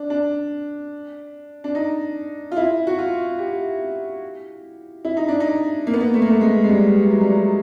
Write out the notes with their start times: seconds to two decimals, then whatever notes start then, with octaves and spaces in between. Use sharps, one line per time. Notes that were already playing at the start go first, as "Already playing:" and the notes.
Already playing: D4
0.10 D4
1.64 D4
1.75 D#4
2.51 F4
2.57 E4
2.87 F#4
2.98 F4
3.39 G4
5.05 E4
5.17 D#4
5.28 D4
5.40 D#4
5.87 A#3
5.94 B3
6.01 A#3
6.14 A3
6.22 A#3
6.30 A3
6.41 G#3
6.64 G#3
6.69 G3
7.10 F#3
7.21 G3
7.32 F#3